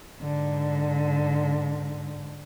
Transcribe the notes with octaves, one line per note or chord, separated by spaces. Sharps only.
G#2 D3